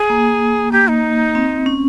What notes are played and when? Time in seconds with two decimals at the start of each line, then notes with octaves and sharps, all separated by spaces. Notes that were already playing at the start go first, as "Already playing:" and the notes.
Already playing: G#4
0.09 A#3
0.72 A#3 G4
0.88 D#4
1.35 C4
1.66 C#4